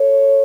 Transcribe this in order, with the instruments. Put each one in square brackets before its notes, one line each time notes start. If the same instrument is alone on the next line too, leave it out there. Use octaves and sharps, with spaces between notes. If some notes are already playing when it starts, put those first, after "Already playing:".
Already playing: [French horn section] A4 C#5